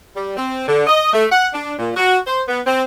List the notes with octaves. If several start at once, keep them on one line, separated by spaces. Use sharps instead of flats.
G3
C4
D3
D#5
A3
F#5
D4
A#2
F#4
C5
B3
C4